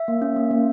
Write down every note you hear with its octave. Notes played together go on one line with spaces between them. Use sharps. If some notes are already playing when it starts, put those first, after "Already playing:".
Already playing: E5
A#3
C#4
A#3
A#3